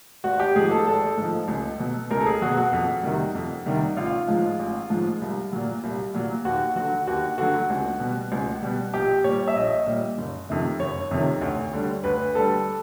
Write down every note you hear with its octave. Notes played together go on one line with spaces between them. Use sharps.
G#1 F#4
G4
G#2 F3 G#4
A4
G#1 A4
G#2 F3
C#2
B2 F#3
C#2 A#4
A4
G#4
B2 F#3 F#4
F#4
F2
C3 D#3 G3
F2
C3 D#3 G3
A1 F4
G#2 F3 G#3
A1
G#2 F3 G#3
C2
A#2 F#3
C2
A#2 F#3
D#2 F#4
D3 F#3 F#4
D#2 F#4
D3 F#3 F#4
C#2
B2 G3
C#2
B2 G3
A#1 G4
A#2 G3 C#5
E5
A#1 D#5
A#2 G3
F#1
F2 C3 D#3
F#1 C#5
F2 C3 D#3
D2
D3 G3
D2 B4
D3 G3 A4